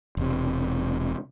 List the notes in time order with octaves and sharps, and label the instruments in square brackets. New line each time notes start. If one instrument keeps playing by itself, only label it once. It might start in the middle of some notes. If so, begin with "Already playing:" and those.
[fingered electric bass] E1 C3